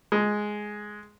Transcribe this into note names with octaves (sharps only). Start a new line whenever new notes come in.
G#3